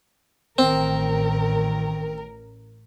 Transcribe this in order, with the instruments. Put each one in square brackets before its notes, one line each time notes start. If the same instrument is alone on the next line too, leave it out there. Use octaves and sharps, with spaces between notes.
[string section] A1 [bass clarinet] D#3 [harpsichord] C4 [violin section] A#4